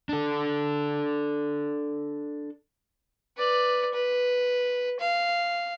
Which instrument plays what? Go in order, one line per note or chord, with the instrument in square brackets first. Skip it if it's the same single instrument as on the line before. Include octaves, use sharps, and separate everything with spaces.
[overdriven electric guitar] D4 A4
[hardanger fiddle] B4 D5
B4
F5